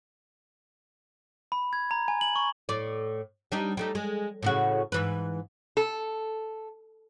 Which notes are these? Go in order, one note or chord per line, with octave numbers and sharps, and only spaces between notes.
B5
G#6
A#5
G#5
F#7
C#6
A2 D5
G3 D4 D#4
G3 A3 D#4
G#3
A2 C#3 F#4
G#2 E3 B4
A4